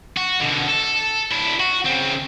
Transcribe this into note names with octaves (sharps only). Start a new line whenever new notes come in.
F#4
B2 D3
A4
D4 E4
F#4
C#3 C4